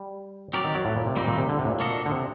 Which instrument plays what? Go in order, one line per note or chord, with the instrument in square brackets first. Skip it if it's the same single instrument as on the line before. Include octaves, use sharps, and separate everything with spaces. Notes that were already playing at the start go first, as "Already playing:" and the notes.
Already playing: [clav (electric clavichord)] G3
[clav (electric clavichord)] F#3 [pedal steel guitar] C4 G4 A#4 D5
[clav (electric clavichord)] D#3
F#3
A2
A#2
C3
[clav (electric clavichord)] A#2 [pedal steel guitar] D#3 G3 C4 D#4
[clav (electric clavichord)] A#2
C3
D3
C3
A2
A#2
[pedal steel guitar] A#3 D4 F#4 A4 D#5
[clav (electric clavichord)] D3
C3